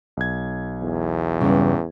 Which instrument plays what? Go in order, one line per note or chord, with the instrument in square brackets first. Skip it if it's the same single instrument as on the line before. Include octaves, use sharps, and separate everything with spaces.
[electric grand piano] B1 G#6
[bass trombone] E2
[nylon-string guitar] G2 C#3 [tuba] G3